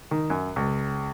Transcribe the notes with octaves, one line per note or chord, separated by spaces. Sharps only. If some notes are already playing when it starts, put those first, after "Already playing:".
D#3
F#2
C#2